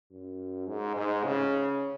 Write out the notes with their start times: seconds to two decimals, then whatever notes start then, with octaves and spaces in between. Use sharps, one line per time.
0.11 F#2
0.67 G#2
0.96 G#2
1.25 C#3